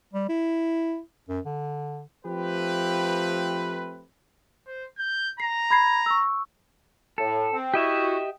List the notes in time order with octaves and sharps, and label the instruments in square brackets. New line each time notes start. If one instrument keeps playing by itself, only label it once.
[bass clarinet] G3
E4
F#2
D3
[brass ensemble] F3 A3 C4 G4 B4
[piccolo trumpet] C5
G6
[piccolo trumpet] A#5 [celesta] C7
[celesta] B5 G#6 C7
C#6 E6
[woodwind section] A2 [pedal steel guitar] A4
[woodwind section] C4
[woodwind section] E4 F#4 [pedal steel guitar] G4 D#5 E5